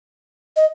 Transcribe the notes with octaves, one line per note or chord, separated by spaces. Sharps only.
D#5